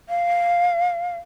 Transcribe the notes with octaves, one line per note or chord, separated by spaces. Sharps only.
F5